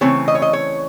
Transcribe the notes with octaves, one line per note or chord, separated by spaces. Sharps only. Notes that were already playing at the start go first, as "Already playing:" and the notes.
C#3 E3 A3 C4 C#5
D#5
C#5
D#5
C#5